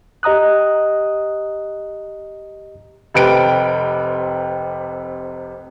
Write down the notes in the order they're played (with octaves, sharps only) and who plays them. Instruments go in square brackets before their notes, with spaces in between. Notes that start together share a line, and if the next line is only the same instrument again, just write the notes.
[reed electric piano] G4 D#5 A#5 D#6 F#6
[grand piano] F1 C3 B4 G5 D7